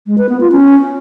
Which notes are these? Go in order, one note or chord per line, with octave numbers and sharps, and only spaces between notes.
G#3
B4
B3
F4
C#4